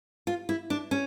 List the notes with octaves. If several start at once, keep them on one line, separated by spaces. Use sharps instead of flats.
F4
E4
D4
C#4